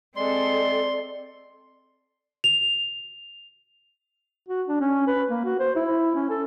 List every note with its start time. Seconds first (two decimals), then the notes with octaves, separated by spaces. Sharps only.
0.16 G#3 C4 A4 D5 C6
2.44 F7
4.49 F#4
4.68 D4
4.81 C#4
5.07 B4
5.30 A#3
5.45 F#4
5.59 C5
5.76 E4
6.15 C#4
6.30 A4